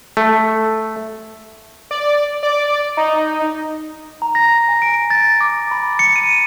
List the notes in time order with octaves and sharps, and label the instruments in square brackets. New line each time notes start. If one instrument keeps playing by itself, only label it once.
[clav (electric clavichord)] A3
[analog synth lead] D5
D5
D#4
[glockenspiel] A#5
A#6
G#5
D7
A6
D6
B5
C#7
D#7